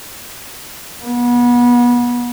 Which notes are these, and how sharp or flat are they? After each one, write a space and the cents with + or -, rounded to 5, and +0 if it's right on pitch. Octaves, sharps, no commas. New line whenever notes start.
B3 -30